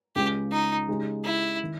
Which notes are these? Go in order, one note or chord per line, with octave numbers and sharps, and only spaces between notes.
C#2 C#3 G#3 C#4 G4
D#4
C#3 G#3 D#4 G4
E4
D#3